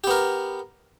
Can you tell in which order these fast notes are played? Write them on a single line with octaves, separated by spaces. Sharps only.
G4 B3 A#4